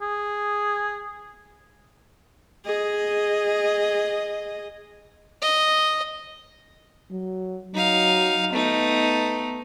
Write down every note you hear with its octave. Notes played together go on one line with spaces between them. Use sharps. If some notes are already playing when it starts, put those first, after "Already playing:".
G#4
G#4 D#5
D#5
F#3
F#3 D#4 F5
A3 B3 D#4